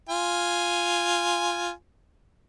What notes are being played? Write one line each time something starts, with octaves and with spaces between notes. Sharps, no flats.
F4 G#5